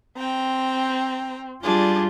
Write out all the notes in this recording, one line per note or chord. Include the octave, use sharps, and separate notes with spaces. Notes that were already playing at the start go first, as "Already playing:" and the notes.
C4 G5 A#5
G3 D4 F4 G#4